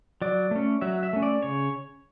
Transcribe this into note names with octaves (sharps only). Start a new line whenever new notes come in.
F#3 D5
A3 C#4
F#3 E5
E5
A3 C#4
D5
C#3 C#5